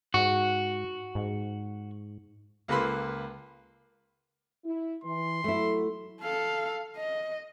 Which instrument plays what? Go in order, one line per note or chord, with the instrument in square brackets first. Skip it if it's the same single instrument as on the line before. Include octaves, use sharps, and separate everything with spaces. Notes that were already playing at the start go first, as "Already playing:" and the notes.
[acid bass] G#2 [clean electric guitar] F#4
[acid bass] G#2
[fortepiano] C#2 A#3 A4 B4 B5 C6
[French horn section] E4
[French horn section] E3 [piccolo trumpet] C6
[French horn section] F#3 [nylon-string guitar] A3 E4
[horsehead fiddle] A4 F5
D#5